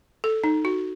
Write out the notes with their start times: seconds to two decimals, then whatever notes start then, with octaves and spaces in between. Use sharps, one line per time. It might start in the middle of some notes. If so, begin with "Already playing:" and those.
0.24 A4
0.44 D#4
0.65 F#4